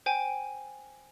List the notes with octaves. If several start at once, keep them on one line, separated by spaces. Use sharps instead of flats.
C5 G5 G#5